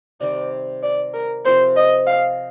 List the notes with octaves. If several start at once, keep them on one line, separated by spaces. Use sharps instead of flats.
C3 D#3 G3 D5
D5
A#4
C3 F3 C4 C5
D#5
F5